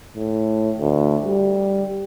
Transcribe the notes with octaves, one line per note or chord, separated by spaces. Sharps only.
A2
D2
G3